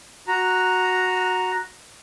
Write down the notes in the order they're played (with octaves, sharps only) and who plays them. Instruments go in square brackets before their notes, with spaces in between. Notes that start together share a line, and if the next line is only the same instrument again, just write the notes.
[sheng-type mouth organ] F#4 A#5